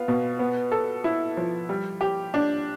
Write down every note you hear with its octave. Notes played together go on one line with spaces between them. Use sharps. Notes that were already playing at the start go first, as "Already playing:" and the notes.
Already playing: B3 F4
B2
B3
A4
E4
F3
G3
G4
D4